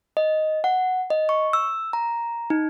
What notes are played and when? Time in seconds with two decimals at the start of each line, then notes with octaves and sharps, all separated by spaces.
0.17 D#5
0.64 F#5
1.10 D#5
1.29 C#6
1.53 E6
1.93 A#5
2.50 D#4